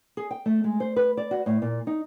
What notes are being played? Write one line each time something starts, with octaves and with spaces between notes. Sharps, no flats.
G#4
G5
A3
G#3
C5
B4
D5
F#4
A2
A#2
D#4